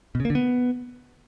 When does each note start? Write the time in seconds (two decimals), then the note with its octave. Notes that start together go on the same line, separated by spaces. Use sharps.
0.15 B2
0.20 C#3
0.25 A#3
0.30 D3
0.35 B3